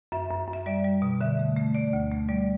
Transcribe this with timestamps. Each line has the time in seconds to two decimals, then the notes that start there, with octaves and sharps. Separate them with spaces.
0.12 F#2 E5
0.31 F#2
0.48 F#2
0.53 E5
0.66 G3 D5
0.84 G3
1.02 B2
1.21 D3 E5
1.39 A3
1.56 A3
1.75 A3 D5
1.93 D2
2.11 A3
2.29 G3 D5